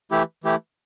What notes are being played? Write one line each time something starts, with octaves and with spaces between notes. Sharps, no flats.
E3 A3 E4 G4
E3 A3 E4 G4